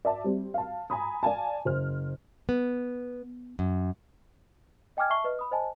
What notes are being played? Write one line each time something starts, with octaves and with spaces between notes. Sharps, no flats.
D5 E5 A5
G3 C4
F5 A5
G#5 A#5 B5 D#6
D5 F5 G#5 A5
F#1 C5 F6
B3
F#2
D#5 G5 G#5 D6 F6 G#6
E5 A5 C#6 C7 G7
B4 D#5 F6
B5 D#6
C5 D#5 G#5 A5